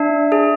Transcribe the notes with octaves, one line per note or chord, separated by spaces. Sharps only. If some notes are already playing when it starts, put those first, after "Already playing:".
Already playing: D4 E5
G#4